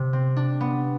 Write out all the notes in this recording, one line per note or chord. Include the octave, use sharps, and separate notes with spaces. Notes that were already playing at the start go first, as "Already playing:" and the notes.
Already playing: C3
C4
D4
B3